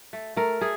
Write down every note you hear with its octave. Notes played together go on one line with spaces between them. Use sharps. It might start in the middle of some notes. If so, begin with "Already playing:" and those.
A3
A3 A#4
A3 G#4